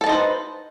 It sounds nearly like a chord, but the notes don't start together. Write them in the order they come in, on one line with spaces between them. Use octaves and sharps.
A4 A5 D#4 C5 B4